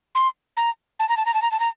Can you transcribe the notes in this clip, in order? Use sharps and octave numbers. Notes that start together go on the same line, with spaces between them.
C6
A#5
A5
A#5
A5
A#5
A5
A#5
A5
A#5